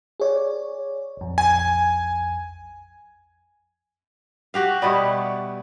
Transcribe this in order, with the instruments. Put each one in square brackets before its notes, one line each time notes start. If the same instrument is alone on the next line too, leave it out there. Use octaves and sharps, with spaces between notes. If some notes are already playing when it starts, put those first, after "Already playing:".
[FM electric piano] G#4 C#5 D5
A#1 F2
[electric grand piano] G#5
[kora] F#4 G4 F5
[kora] B2 G3 B3 [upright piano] D5 E5 C#6